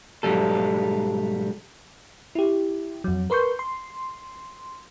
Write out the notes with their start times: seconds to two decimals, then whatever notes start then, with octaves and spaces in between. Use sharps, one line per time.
0.23 B1 G#2 F#3 G3 A4
2.35 E4 G4
3.04 F2 F#3
3.30 A#4 B4 C6 C#6 G6
3.59 C6